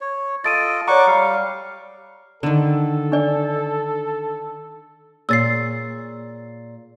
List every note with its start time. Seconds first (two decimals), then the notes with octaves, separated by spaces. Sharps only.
0.01 C#5
0.44 F4 A4 D#5 A6 D7 D#7
0.88 C#5 D5 F#5 A#5 C#6 D6
1.07 G3 F5
2.43 D3 D#3 A4
3.12 D4 D5
5.29 A#2 G#4 C#5 E6 A6 C7